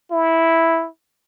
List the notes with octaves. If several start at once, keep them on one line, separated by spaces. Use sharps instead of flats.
E4